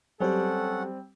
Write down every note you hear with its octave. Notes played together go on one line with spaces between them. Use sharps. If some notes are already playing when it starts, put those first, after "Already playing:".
F#3 G3 C4 C#4 G4 A4 F#5